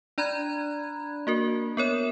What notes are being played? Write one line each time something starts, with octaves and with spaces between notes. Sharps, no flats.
D4 D5 A#5 B5 F#6 G#6
A#3 F#4 A#4
B3 A#4 C#5 E7